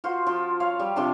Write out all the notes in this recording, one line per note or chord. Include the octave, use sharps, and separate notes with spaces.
F4 F#4 C5
F3
C#5 F5
G3
C3 F3 D4 A5